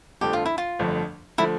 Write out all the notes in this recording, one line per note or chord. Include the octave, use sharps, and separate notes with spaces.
G1 F2 D3 F3 A3 G4
F4
E4
F4
G1 F2 D3 F3 A3
D3 F3 A3 E4